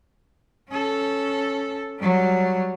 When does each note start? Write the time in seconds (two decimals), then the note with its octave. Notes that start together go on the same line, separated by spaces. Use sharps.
0.69 C#4 A4
1.99 F#3 G3